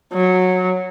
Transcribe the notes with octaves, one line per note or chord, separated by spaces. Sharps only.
F#3